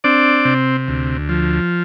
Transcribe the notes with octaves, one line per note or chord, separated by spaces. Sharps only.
C4 D4 D5
C3
D2
F3